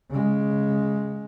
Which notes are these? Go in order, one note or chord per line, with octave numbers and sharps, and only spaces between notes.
C#3 G#3